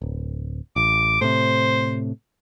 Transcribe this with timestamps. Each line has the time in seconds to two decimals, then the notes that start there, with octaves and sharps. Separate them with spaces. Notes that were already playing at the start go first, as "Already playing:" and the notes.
0.02 D1
0.76 A1 D6
1.21 A2 C3 C5